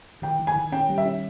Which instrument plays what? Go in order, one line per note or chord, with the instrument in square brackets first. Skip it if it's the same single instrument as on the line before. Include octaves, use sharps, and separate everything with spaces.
[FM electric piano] D#3 [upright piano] G5
[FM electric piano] D#3
[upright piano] G#5
[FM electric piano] D#3
[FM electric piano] C#4 [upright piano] G5
[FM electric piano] G3
[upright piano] E5
[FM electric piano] C#4